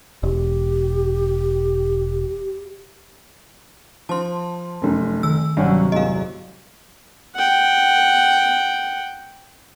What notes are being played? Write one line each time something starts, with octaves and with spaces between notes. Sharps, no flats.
E1 G4
F3 A5 C6
F1 F#2
D#3 E6
G1 G2 C3 F#3 C#4 F#5
G#1 E2 G#3 D#5 F5
F#5 G5